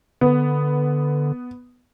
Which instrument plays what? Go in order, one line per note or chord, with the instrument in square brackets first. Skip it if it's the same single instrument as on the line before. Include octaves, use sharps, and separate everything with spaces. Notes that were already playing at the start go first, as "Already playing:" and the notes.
[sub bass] D3 [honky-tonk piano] B3